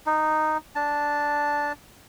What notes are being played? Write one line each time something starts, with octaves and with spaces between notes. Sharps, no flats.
D#4
D4 A5